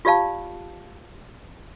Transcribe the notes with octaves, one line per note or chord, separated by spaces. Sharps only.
F4 G4 D5 F5 A5